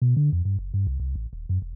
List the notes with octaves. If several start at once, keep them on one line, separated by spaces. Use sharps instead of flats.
B2
D3
F2
G2
F#1
G2
C2
C2
A1
D#1
F#2
E1